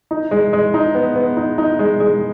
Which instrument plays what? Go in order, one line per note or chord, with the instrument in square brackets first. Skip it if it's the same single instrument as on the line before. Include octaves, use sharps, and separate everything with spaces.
[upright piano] D#4
G#3
G#3
D#4
B3
B3
D#4
D#4
G#3
G#3